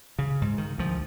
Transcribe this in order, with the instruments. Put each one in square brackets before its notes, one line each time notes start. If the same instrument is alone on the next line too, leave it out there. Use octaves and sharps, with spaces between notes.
[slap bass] C#3
G#2
D#3
D2 F3